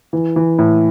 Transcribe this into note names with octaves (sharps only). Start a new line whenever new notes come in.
E3
E3
A2